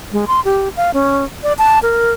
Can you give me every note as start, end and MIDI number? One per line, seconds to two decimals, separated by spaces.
0.12 0.25 56
0.28 0.40 84
0.44 0.69 67
0.77 0.91 77
0.94 1.24 61
1.43 1.53 74
1.58 1.79 81
1.83 2.13 70